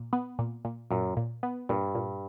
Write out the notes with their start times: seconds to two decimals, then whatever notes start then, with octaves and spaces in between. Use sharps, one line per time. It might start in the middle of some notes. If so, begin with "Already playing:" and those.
Already playing: A#2
0.13 B3
0.39 A#2
0.65 A#2
0.91 F#2 A#2
1.17 A#2
1.43 B3
1.69 G2 A#2
1.95 A#2